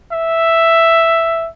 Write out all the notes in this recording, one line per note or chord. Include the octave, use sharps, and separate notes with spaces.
E5